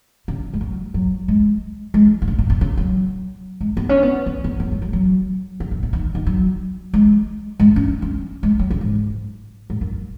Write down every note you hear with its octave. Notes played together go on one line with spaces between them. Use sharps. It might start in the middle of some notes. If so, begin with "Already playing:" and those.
C#3
G#3
F#3
F#3
G#3
G#3
B2
C#3
B2
B2
C#3
F#3
G#3
B3
C#4
B3
B3
B3
B3
G#3
F#3
F#3
C#3
B2
B2
D#3
D#3
F#3
G#3
G#3
C#4
C#4
G#3
F#3
C#3
G#2
G#2
F#2